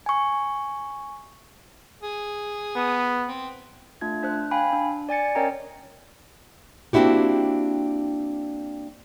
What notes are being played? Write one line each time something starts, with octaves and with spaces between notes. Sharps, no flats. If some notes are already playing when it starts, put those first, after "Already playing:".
G#5 C#6
G#4
B3
C4
A3 D4 F4 G#6
D4 C5 F#6
F5 G5 G#5 B5
D4
D5 G#5 A6 C#7
C#4 A#4 C#5 D#5 G5 A#5
A#3 C4 D4 E4 F#4 G4